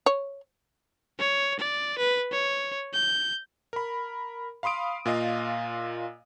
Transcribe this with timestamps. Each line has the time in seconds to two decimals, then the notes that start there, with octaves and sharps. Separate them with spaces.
0.06 C#5
1.19 C#5
1.59 D5
1.98 B4
2.32 C#5
2.94 G6
3.73 A#4 B5
4.63 F5 B5 C6 D#6 D7
5.06 A#2 F4 D#5 F5